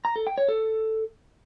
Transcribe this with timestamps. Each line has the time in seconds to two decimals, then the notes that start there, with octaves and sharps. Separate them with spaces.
0.05 A#5
0.16 A4
0.27 G5
0.38 C#5
0.49 A4